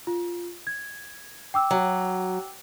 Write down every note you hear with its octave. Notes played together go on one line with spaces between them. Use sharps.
F4
G#6
G5 D6 E6
F#3